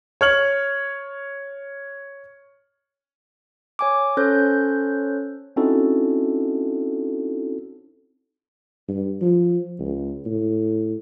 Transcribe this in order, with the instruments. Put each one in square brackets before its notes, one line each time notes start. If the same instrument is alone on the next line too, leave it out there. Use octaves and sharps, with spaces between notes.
[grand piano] C#5 F6 F#7
[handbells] C#5 G#5 D6
C#4 A4 C5 C#5 F#6 G6
[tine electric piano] C4 C#4 D#4 E4 F#4 A4
[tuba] G2
F3
C#2
A2